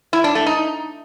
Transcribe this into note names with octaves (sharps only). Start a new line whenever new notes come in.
E4
D4
A3
D#4